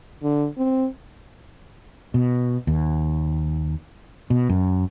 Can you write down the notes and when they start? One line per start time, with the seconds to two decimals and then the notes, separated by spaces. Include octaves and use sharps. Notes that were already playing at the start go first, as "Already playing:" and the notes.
0.23 D3
0.58 C4
2.14 B2
2.67 D#2
4.30 B2
4.49 F#2